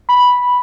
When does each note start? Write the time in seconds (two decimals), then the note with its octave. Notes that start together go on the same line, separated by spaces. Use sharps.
0.09 B5